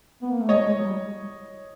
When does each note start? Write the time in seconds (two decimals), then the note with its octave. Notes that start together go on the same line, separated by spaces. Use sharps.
0.22 B3
0.31 A#3
0.40 A3
0.49 G#3 C#5 D#5
0.66 G#3
0.80 F#3
0.85 G3